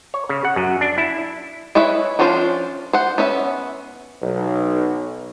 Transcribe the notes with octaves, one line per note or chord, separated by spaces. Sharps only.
C#5
C#3
F#5
F#2
D4
E4
G#3 E4 B4 C#5 E5
F3 C#4 D4 F4 C5
C5 F#5
B3 C#4 E5
B1